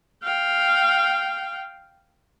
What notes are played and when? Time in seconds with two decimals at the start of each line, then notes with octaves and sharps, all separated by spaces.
0.23 F5 G5